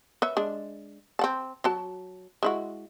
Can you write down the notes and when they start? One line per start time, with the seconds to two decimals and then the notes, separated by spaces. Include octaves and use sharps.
0.22 B4 C#5 E5
0.37 G#3 D4
1.19 C4 F#5 A5
1.64 F#3 F#4 A5
2.43 G#3 E4 F#4